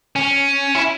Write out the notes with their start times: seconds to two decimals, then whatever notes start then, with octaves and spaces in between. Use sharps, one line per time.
0.16 C#4
0.75 E4